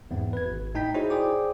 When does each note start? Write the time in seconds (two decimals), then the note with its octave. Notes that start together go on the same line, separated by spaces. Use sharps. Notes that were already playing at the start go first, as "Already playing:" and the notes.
0.11 E2 G#2 C4
0.33 B4 G#6
0.46 G#1
0.75 A2 D#4 G5 G6 B6
0.94 D#4 E4 F#4 G#4 C5 C#5
1.10 G#4 C5 D5 G5 D6